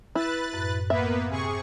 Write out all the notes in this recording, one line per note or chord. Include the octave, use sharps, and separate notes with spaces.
E4 B4 F#6 A6
F#2 A2
A#3 B3 B4 E5
C3 G#4 C#6